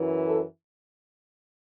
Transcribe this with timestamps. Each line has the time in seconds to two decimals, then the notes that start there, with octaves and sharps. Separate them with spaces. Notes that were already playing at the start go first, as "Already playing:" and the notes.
Already playing: F#2 E3
0.28 A4